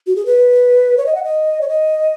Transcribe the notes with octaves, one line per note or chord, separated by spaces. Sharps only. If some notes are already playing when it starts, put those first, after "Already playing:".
F#4
G#4
B4
C#5
D#5
F#5
D#5
C#5
D#5